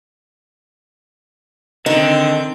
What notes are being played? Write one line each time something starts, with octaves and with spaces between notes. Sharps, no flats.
D3 D#3 C4 D#5 G5